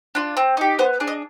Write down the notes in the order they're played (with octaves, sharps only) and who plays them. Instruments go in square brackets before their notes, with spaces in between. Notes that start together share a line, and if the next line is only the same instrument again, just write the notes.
[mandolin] D4 F4
C4
D#4 G4
B3 C5
D4 G#4
D#5